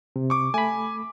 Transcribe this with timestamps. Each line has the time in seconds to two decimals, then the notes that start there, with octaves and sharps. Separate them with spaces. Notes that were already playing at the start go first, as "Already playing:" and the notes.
0.16 C3
0.30 C#6 D6
0.54 A3 G#5 B5